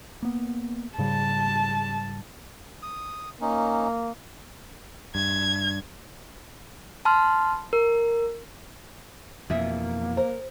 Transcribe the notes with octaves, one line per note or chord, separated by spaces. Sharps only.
A#3 B3
G#2 C#3 G3 A5
D#6
A#3 C#4 D#4
G2 G#6
A5 B5 C6 F6
A#4
F2 B2 E3 A#3 G#4 E5
A#4 C5